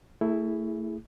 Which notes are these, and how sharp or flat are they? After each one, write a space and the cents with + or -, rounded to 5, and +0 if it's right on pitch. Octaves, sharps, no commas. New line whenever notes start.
A3 +30 E4 +0 G#4 +0